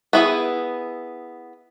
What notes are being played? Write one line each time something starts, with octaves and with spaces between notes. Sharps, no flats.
B3 E4 G#4